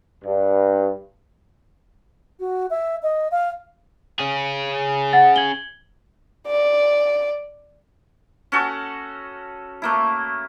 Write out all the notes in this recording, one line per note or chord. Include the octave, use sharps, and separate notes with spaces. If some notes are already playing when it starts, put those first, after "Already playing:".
G2
F#4
E5
D#5
F5
C#4 G#4
F#5 A6
G#6 F#7 G7
D5
C#4 F#4 A4
A3 A#3 E4